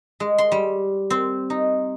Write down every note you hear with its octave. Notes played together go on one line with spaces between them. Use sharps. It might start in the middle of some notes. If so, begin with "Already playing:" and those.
G#3
C6
G3
C4
D#4